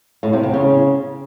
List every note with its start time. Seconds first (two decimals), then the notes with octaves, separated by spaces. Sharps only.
0.23 A2
0.33 C3
0.43 E2
0.54 C#3